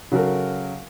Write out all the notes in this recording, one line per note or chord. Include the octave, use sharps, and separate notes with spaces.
C#3 F#3 F#4 A4 A#4